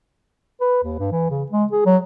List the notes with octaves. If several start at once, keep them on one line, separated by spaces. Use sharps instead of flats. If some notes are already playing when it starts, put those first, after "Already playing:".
B4
D#2
G2
E3
C#3
G#3
G#4
F#3